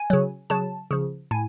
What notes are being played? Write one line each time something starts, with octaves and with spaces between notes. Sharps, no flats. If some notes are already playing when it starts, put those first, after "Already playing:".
Already playing: G#5
C#3 F#3
C#3 F#3 A5
C#3 F3
A2 G#5